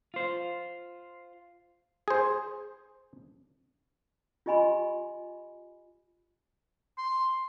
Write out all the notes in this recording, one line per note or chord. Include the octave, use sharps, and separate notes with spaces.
F4 C5
G#4 C5
F4 G4 D#5 G#5 B5 C6
C6